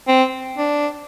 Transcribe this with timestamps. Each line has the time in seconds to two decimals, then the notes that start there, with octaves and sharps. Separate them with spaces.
0.08 C4
0.58 D4